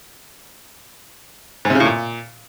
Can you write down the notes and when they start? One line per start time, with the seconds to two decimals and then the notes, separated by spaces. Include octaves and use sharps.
1.65 G#2
1.70 C3
1.75 C#3
1.80 A2
1.85 A#2